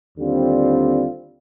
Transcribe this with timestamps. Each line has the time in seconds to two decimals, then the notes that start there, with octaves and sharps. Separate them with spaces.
0.18 D#2 D3 G3 C4 F4